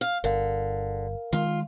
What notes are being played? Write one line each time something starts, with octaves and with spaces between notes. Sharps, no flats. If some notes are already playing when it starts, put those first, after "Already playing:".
F5
G1 D3 A#4 F5
D#3 G#3 F4